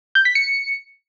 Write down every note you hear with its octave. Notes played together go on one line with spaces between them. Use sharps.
G6
B6
C#7